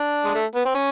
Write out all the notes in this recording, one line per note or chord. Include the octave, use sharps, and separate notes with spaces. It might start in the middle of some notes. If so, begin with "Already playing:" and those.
Already playing: D4
G#3
A3
B3
C4
C#4